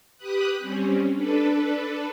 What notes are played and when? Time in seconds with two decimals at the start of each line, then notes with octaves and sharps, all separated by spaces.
0.17 G4 B4 B5 D#6 F#6
0.58 G3 C4 C#4
1.12 D4 A4 B4